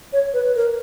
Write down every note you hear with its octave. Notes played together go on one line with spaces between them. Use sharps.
C#5
B4
A#4